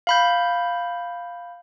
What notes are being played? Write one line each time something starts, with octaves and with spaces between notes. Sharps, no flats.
F5 B5 G6